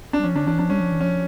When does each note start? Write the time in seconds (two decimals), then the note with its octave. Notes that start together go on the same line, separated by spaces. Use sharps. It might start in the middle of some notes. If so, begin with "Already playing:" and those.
0.13 D4
0.19 G3
0.24 F3 C#4
0.35 D3 D4
0.47 E3 D4
0.59 F3 D4
0.70 G3 C#4
0.80 F3
0.92 E3
1.01 F3 C#4